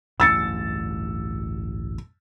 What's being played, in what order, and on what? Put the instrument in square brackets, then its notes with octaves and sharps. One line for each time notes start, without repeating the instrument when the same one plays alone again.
[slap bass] A1 D2 G2 [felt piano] E6 A6 C#7